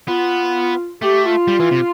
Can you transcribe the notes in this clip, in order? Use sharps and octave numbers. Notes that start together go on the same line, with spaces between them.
B3 F4
A3 G4
F4
G3
E3
C3